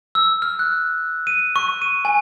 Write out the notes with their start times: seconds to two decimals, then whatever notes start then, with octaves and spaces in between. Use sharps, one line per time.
0.15 E6
0.42 F6
0.59 F#6
1.27 D#7
1.56 C#6
1.82 D#7
2.05 G#5